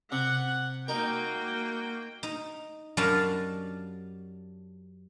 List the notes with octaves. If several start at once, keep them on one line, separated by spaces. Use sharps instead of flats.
C3 F#5
A#3 D#4 F#4 A#4 G5
D#4
F#2 G3 D4 D#5 F5 A5